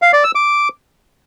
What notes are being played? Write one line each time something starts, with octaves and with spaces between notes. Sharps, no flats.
F5
D5
E6
D6